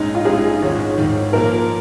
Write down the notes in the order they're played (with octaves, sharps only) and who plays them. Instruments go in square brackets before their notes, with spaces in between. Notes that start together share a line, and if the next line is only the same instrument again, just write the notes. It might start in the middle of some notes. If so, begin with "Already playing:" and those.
Already playing: [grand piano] A#1 G#2 G#3 C#4 [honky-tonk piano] D#4
[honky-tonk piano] F4
[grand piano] A#1 G#2 G#3 C#4 [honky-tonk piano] G#4
[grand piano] G#1 G#2 D#3 [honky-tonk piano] C#5
[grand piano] G#1 G#2 D#3
[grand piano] A#2 F3 A#3 [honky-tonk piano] A#4